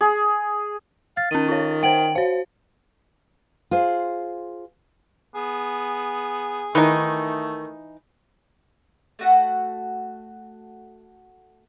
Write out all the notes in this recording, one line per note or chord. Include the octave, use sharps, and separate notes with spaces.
G#4
F5 A6
D#3 C#4 D#7
F4 C#5
C5 F#5 G5 D7 F#7
F#4 C5 C#5 F5
F4 G#4 C5
B3 G#4
D#3 E3 A3 D#4
A3 F#4 F#5